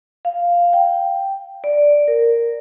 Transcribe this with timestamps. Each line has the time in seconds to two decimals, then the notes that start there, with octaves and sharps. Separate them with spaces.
0.25 F5
0.73 G5
1.64 D5
2.08 A#4